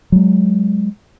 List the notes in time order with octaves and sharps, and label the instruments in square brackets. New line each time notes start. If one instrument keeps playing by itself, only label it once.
[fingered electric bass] F#3 G#3